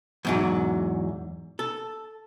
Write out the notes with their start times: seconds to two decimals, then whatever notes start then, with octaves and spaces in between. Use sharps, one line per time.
0.25 E2 G#2 F#3
1.59 A4